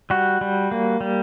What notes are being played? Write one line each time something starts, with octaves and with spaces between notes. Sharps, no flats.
G3 F#4
G3
A#3
G3